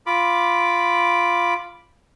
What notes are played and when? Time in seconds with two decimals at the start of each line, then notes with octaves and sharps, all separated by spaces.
0.06 F4 B5 D6